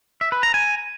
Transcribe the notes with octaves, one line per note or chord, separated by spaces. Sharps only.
E5
B4
A#5
G#5